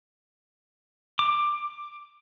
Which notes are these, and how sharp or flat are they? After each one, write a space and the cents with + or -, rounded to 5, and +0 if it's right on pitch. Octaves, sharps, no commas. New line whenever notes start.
D6 +15